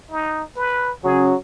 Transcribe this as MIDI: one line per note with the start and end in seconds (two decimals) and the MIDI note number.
0.11 0.43 63
0.56 0.92 71
1.04 1.34 49
1.04 1.35 54
1.04 1.34 61
1.04 1.29 68